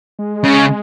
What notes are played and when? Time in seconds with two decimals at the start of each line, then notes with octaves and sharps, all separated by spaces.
0.19 G#3
0.44 C#3